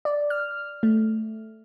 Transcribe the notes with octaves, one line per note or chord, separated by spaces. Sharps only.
D5
F6
A3